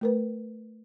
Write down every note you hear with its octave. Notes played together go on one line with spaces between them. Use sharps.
A3 A#4 B4